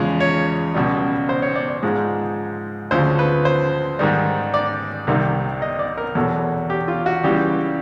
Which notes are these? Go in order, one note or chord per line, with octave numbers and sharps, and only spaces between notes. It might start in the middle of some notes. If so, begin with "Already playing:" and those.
Already playing: E2 C#3 F3 G#3
C#5
C#2 B2 G3
C5
C#5
D5
D5
G#2 F3 G#3
D2 C#3 F3 C5
B4
C5
G#2 D#3 G3
D5
C2 C3 D#3 G3
D#5
D5
A#4
E2 B2 F#3 A4
G4
F4
F#4
C#2 C#3 E3 G3 G4